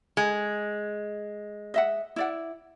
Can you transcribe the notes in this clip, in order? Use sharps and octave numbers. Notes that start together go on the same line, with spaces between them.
G#3
D#5 E5 F#5
E4 D5 F#5